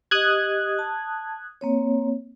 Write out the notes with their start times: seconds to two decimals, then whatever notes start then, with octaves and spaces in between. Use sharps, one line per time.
0.11 G4 D#5 D#6 F#6 G#6
0.79 A5
1.61 A#3 C4 C#5